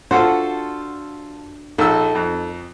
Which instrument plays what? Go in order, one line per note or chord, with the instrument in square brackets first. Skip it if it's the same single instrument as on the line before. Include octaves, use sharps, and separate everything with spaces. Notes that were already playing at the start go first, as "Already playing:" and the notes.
[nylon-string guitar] D4 F#4 [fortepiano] F4 A4 C5
[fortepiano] A#1 E6 [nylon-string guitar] D#4 A4
[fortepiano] F2